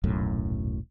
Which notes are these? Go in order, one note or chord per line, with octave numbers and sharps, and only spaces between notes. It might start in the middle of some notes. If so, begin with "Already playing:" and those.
D#1 B1 F#2 A2